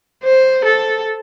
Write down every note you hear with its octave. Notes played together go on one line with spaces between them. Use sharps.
C5
A4